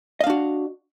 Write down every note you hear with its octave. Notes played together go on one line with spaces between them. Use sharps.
D4 F#4 D#5 F5